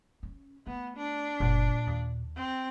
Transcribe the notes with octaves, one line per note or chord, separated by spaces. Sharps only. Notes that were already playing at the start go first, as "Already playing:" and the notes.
C#4
A3 B3
D4
F#1 A#2
D#2
C4